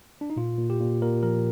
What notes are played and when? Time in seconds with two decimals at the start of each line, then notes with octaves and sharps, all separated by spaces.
0.21 D4
0.30 D#4
0.36 A#2 F4
0.58 A#2
0.70 G4
0.80 A#2
1.02 A#2 A#4
1.23 F3 A#4